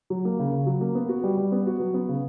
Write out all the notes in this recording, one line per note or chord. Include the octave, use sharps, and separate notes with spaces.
F#3
A#3
C#3
C#3
F#3
A#3
B3
F#4
G3
G3
B3
F#4
F#3
B3
C#3